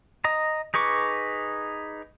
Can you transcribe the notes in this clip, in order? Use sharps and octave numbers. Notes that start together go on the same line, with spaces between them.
D#5 A#5
D#4 G#4 B4 C#6 D6